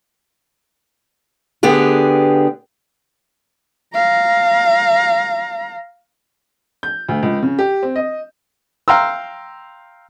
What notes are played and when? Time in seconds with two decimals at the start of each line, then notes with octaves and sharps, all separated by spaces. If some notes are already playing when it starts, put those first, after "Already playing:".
1.63 D3 B3 G4 G#4
3.94 F5 A#5
6.83 G6
7.08 D2
7.23 C#2
7.43 C#3
7.59 G4
7.83 C4
7.96 D#5
8.88 F5 G5 A#5 C6 E6